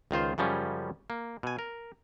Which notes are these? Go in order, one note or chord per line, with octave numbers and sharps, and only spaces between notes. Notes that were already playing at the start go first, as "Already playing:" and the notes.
C#2 D#3 F4 C5
F#2 C#3 F3 G3 C#4
A#3
B2 G#5
A#4